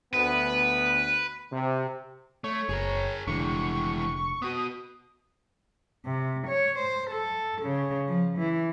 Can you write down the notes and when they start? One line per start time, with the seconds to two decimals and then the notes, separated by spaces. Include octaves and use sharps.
0.13 D2 B3 B4
1.51 C3
2.44 A3 C#5
2.69 F#1 G#4 A#4
3.27 F1 D3 E3 G#3 C#6
4.42 B3 F#4 D#6
6.06 C3
6.47 C#5
6.79 C5
7.10 A4
7.62 C#3
8.08 F3
8.38 E3